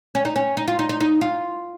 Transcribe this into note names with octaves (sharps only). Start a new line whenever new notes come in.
C#4
D#4
C#4
D#4
F4
D#4
D#4
D#4
F4